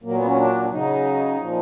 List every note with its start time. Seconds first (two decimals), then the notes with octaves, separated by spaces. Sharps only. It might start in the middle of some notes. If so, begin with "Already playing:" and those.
0.03 A#2 F#3 A#3
0.15 B3
0.25 C#4
0.37 D4
0.65 D4
0.70 C#3 F#3 D#4
1.38 A#2 F3